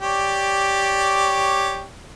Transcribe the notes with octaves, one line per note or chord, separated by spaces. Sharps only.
G4 C#5 D5